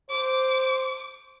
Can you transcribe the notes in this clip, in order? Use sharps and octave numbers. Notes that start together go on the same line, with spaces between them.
C5 D6